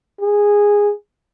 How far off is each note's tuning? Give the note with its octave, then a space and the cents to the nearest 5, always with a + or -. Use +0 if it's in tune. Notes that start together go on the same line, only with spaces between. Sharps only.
G#4 -10